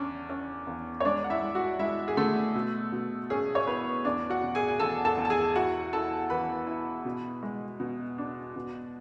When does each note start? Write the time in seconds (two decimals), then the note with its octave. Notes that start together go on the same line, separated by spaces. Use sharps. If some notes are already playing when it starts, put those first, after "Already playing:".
Already playing: E2 C#4 D4
0.29 C#4
0.67 E2
1.00 C#5
1.05 G#3 D4 D5
1.24 F#5
1.30 E4 E5
1.43 G#3
1.55 F#4 F#5
1.79 G#3 E4 E5
2.08 G#4
2.17 D3 A3 A4
2.55 B2
2.92 B2
3.30 C#4 G#4
3.55 C#5
3.67 B3 E4 B4
4.04 E2 D4 D5
4.30 F#4 F#5
4.43 B2
4.55 G#4 G#5
4.68 G#5
4.79 E2 A4 A5
5.05 A4 A5
5.17 E2
5.25 A5
5.30 G#4 G#5
5.55 E4 F#4 F#5
5.93 E4 A4 A5
6.30 E3 B4 B5
6.67 E4
7.05 B2
7.43 G#3
7.80 B2
8.18 D4
8.56 B2